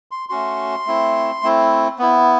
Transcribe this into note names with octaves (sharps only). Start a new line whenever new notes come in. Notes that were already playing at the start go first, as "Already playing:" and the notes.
C6
A3 C#4 F#4 C6
A3 C4 E4
A3 C4 E4
B3 E4